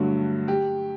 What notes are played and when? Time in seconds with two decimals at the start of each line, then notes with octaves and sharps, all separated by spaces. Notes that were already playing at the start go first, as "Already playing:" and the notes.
Already playing: G2 D3 F#3 A3
0.48 G4